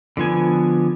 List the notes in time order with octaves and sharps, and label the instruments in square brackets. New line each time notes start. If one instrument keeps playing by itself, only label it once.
[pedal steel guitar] D3 F3 B3 G#5